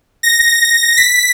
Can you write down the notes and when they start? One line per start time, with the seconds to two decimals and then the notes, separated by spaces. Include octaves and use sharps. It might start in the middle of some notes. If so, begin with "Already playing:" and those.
0.23 A#6
0.97 B6